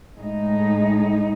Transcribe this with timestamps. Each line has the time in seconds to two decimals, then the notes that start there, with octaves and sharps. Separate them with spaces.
0.15 A2 G#3 D#4